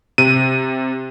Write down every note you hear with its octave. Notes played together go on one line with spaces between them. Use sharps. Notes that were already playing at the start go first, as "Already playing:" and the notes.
C3 D#7